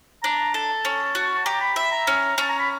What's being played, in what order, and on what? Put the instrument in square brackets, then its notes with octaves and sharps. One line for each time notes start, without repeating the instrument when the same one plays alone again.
[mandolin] D4 [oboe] A#5
[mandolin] A4 [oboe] A5
[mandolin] C#4
F#4
[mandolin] G4 [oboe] A#5
[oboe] B5
[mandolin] E5 [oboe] B5
[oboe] A#5
[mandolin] C#4
[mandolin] C#4 [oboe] A5
[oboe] A#5
B5